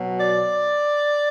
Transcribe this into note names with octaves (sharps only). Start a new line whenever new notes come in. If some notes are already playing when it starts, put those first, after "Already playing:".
Already playing: B2 F#3
D5